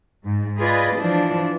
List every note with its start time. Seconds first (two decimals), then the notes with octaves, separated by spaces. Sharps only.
0.25 G#2
0.58 F4 G#4 B4 D5 D#5
0.96 E3 F3 D4